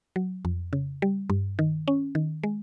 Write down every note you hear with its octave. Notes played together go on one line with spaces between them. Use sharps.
F#3
F2
C#3
G3
G2
D#3
C#4
D#3
G#3